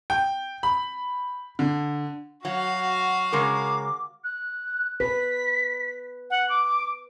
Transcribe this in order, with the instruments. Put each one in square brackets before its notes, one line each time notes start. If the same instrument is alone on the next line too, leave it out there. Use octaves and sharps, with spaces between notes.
[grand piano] G5
B5
D3
[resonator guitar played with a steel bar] F#3 [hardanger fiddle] F#4 F5
[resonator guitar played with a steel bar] C#3 G#3 A#4 [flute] D6
[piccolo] F#6
[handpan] B4 [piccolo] B6
[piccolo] F#5
D6